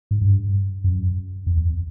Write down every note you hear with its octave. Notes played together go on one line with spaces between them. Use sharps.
G#2
G2
F#2
F2
E2